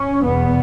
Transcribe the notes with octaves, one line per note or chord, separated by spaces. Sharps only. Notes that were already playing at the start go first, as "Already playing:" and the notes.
Already playing: C#4
E2 B2 B3